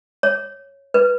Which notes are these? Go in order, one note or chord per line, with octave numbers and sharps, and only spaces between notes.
C#5
B4